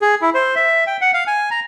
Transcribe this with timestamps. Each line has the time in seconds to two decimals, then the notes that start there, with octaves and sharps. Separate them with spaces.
0.02 G#4
0.22 E4
0.34 C5
0.56 E5
0.87 G5
1.01 F#5
1.14 F5
1.27 G#5
1.51 A#5